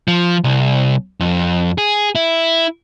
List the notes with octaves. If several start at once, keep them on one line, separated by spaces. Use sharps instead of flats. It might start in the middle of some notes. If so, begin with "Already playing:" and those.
F3
C2
F2
G#4
E4